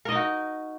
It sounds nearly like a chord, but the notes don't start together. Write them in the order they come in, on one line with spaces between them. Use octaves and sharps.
A#4 D#5 D#4 F#4